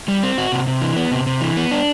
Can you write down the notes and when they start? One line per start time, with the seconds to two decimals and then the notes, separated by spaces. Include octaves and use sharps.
0.08 G3
0.23 C4
0.38 F#4
0.52 C3
0.67 C3
0.82 E3
0.96 B3
1.12 C3
1.27 C3
1.41 E3
1.57 B3
1.71 D4